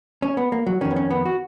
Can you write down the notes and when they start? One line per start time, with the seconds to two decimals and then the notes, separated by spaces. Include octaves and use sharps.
0.22 C#4
0.37 B3
0.52 A#3
0.66 F#3
0.81 F2 D#3 C#4
0.91 B3
0.96 C#4
1.10 B3
1.25 F#4